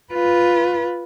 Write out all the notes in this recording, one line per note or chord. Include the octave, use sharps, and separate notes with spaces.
F4 B4